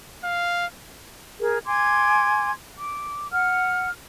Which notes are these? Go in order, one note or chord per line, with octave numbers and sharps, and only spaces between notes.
F5
G#4 A#4
G#5 C6 D6 G#6
D6
F#5 F6